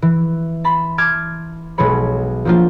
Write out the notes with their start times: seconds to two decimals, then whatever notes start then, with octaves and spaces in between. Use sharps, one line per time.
0.02 E3
0.64 A5 B5 C6 B6
0.98 A5 D6 F6 G#6
1.78 B1 B2 F#3 G#3 C#5 B5
2.45 F3 F#3 A#3 D4 F4